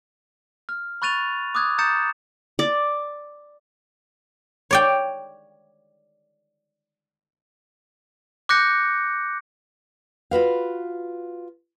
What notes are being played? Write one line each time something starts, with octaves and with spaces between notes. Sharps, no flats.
F6
B5 C#6 F#6 A6 D#7 F7
D6 D#6 F#6 G#6
A#5 D#6 G6 A6 C#7 E7
D5
C#5 D5 G5
D6 F#6 G6 A#6 C#7
F4 F#4 B4 F5